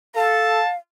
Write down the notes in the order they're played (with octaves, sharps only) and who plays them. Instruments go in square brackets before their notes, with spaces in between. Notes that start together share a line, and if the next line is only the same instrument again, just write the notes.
[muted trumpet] A4 [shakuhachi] F5 [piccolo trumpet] A5